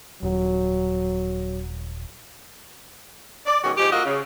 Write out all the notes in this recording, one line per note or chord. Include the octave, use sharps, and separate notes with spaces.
D#1 F#3
D5
B2 D#3 G#3 C#4 F#4
G#2 F3 G#3 G4
A#3 F4 F#4 A4 D#5
C#3